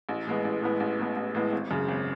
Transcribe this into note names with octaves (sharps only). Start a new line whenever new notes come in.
A1
A2 G#3 B3
A1
A2 G#3 B3
A1
A2 G#3 B3
A1
A2 G#3 B3
G#1
F#2 C#3
G#1